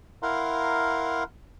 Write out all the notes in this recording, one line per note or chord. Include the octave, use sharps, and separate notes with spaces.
E4 A#4 F5 F#5 A#5 C6